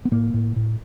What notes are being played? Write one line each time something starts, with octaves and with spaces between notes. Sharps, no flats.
B3
A2 A#3
A2
A2